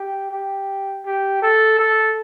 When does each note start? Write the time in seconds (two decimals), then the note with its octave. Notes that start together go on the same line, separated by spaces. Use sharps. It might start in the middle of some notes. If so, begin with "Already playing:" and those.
Already playing: G4
0.31 G4
1.05 G4
1.43 A4
1.79 A4